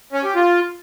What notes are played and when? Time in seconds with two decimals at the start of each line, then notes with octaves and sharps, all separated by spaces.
0.13 C#4
0.24 G4
0.35 F4